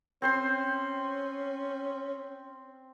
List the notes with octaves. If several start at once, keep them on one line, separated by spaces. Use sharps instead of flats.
C4 C#4 C5 C6